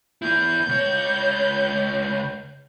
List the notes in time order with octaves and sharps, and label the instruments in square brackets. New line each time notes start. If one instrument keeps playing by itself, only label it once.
[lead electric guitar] B3 E4 [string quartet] G6
[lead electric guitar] C#2 C#5